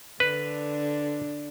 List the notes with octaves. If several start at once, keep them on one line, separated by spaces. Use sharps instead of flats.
D3 D4 B4